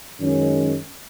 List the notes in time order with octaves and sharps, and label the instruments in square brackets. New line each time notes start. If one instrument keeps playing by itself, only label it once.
[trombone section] F#2 D#3 G#3 C#4